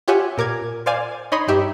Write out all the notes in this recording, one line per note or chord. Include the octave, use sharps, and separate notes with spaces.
F4 G4 C#5 E5 F#5 G#5
A#2 A#4 D6 G#6
C5 D5 F5 G#5 D6
D#4 C#5 D#5 B5 C6 D#6
G2 D#4 G4 E5